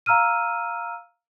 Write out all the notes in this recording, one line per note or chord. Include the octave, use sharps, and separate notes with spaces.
F5 A#5 E6 F6 D#7